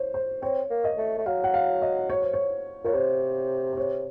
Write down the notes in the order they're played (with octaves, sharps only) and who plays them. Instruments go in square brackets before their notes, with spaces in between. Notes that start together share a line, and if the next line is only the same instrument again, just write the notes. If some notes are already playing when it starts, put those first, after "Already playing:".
Already playing: [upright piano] C5 C#5
C5
[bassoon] C4 [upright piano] C#5
[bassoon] A#3
[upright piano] D#5
[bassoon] A3
A3
[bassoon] F#3 [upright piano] F5
[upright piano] F#5
F5
D#5
C#5
C5
C#5
[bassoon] A#2 [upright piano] C#5
[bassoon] C3 [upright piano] C5
[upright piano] C5
C#5